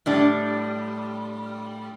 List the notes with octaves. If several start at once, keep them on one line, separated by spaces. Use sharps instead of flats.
A2 G3 D4